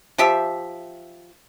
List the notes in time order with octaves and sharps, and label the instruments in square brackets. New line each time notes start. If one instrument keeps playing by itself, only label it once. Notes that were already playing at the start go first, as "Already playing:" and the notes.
[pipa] F3 G4 E5